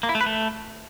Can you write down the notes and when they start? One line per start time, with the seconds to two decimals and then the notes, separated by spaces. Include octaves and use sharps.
0.03 A#3
0.09 E4
0.15 A3
0.21 B4
0.26 A3